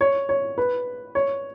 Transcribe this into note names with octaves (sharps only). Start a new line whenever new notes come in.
C#5
C#5
B4
C#5